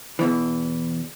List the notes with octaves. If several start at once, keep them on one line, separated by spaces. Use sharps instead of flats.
E2 B2 E3